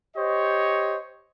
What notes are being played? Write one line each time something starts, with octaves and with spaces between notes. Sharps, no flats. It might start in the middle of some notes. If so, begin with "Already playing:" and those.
G4 C5 C#5 D#5